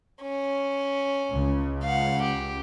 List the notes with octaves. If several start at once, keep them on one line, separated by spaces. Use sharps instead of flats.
C#4
C#2 C#3
F5 F#5
G4